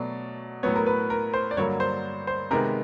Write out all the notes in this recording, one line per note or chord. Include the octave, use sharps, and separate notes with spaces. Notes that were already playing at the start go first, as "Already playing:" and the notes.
Already playing: B2 F#3 A3 D5
A2 F#3 B3 C#5
A#4
B4
A#4
C5
D5
G2 D3 F#3 A#3 C#5
C5
C5
C3 D#3 G#3 B3 A#4